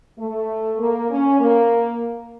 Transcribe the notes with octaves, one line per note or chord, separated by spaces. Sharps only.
A3
A#3
C#4
A#3